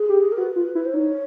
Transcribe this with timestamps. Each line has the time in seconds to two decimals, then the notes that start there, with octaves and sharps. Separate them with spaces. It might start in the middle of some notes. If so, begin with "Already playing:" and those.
Already playing: G#4
0.09 G4
0.32 A#4
0.38 F#4 B4
0.56 F4
0.75 E4 B4
0.85 C5
0.93 D#4 C#5